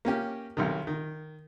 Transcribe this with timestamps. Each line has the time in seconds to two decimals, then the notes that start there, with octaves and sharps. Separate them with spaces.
0.05 A#3 C#4 G4
0.57 B1 C3 D#3
0.87 D#3